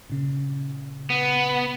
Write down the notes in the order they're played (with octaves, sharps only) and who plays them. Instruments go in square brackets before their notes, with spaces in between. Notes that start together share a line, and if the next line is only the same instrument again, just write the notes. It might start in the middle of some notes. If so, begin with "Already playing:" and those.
[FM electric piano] A#2 C#3
[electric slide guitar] B3